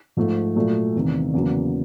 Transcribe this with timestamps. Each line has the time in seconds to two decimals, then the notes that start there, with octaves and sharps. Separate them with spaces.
0.17 G#2 F3 A3
0.56 A#2 F#3 A3
0.95 E2 C3 D#3
1.33 E2 C#3 F#3 A#3